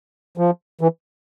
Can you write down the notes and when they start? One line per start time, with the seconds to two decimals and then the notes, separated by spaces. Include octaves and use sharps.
0.38 F3
0.81 E3